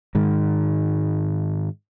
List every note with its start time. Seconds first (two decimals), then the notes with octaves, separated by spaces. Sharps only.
0.15 G#2 D#3 G#3